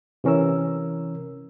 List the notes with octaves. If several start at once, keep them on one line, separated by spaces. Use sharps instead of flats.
C3 E3 C#4 A#4 E6